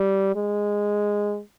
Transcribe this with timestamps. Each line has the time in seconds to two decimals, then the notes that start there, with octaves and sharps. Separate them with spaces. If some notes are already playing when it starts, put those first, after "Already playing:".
Already playing: G3
0.36 G#3